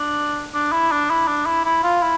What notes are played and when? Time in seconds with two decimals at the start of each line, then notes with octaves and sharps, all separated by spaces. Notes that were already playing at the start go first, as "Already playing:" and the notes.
Already playing: D4
0.54 D4
0.72 E4
0.92 D4
1.10 E4
1.27 D4
1.46 E4
1.65 E4
1.83 F4
2.02 E4